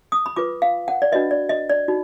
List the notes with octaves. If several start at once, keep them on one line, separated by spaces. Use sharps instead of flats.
D#6
B5
F4 B4 D6
F5
F#5
D5
D4 F#4 B4 D#5
D5
D#5
D5
D#4 F#4